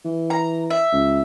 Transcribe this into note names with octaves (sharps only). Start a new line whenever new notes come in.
E3
A#5
E5
C#2